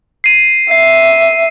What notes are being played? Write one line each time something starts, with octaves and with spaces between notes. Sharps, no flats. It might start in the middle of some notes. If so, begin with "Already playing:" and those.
C7 D#7
E5 C7